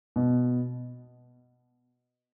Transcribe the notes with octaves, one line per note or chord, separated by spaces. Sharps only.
B2